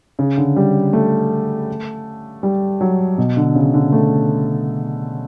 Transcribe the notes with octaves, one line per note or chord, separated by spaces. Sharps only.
C#3
D3
G3
A3
G3
F#3
B2
D3
C#3
D3
A3